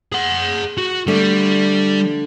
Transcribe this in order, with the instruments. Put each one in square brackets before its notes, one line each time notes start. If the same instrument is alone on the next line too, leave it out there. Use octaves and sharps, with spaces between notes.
[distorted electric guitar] G#4 F#5
F#4
[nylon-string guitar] D3 A3 [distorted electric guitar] G3